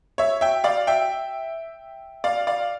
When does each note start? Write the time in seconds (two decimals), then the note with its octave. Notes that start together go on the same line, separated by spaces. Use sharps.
0.18 C#5 E5
0.41 E5 G5
0.64 D5 F5
0.87 E5 G5
2.24 D5 F5
2.47 D5 F5